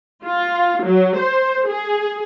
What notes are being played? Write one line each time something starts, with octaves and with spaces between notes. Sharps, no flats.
F4
F#3
C5
G#4